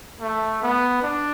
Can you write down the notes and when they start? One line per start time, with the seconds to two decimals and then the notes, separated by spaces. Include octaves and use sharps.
0.21 A3
0.62 B3
1.02 D4